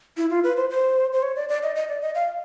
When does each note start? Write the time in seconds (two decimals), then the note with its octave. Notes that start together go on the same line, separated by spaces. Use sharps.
0.17 E4
0.30 F4
0.44 B4
0.57 C5
0.70 C5
1.13 C5
1.23 C#5
1.36 D5
1.49 D5
1.63 D#5
1.76 D#5
1.89 D5
2.02 D#5
2.15 F5